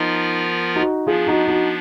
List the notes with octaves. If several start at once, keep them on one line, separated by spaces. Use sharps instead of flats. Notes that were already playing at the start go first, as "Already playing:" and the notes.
Already playing: F3 B3 D#4 F4 A#4
D#4 F#4
F3 B3 D4 F4 G#4
D#4 F#4
D#4 F#4